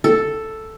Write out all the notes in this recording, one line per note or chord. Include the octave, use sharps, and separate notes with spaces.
A4